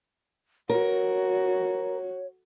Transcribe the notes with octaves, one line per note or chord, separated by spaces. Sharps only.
F#4 A#4 C#5